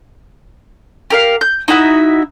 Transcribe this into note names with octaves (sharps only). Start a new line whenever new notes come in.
G4 A#4 F5
G6
D#4 E4 F#4 E5